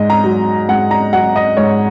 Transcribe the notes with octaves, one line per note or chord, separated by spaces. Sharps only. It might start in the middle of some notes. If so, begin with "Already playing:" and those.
Already playing: G#2 D#5
A#5
F#3
G#2 F#5
A#5
F#3 F#5
D#5
G#2 C#5